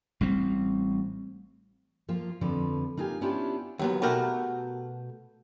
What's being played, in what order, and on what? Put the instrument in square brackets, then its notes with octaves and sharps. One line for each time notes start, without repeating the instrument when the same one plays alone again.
[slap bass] A1 G3 C4
[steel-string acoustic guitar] F3 A#3 F4
F2 D3 F3 B4
A#3 D#4 F4 G4 G#5
B3 C#4 D4 E4 F4 G4
[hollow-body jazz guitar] D#2 F#3 B3
B2 A3 F#4 G4 A#4